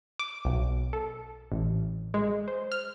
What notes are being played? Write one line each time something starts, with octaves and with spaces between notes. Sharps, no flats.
D6
B1
A4
A1
G#3
C5
F6